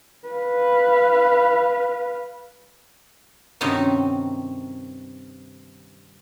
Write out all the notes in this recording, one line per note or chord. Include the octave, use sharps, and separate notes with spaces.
B4 F5
G2 C3 D#3 C#4 D#4 F#4